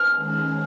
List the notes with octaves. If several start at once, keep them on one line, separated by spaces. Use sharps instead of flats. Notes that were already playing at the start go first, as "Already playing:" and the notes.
Already playing: F6
D#3 G#3 C#4 G#4